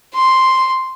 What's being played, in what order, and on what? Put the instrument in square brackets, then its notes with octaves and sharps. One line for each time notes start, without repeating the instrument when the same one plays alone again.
[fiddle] C6